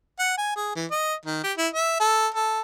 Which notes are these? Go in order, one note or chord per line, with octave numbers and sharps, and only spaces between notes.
F#5
G#5
G#4
E3
D#5
D#3
G4
E4
E5
A4
A4